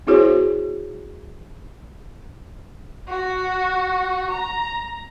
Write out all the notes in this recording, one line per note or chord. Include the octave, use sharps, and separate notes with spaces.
C4 E4 F#4 G#4 C5 C#5
F#4
A#5